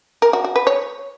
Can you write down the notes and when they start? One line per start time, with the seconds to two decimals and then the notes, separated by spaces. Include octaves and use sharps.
0.22 A#4
0.33 F#4
0.44 F#4
0.56 B4
0.67 C#5